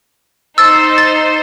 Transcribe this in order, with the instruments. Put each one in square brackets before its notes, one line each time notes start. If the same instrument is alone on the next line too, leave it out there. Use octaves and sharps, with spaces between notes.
[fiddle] D#4 C5 [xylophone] E6 A6
[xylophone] A6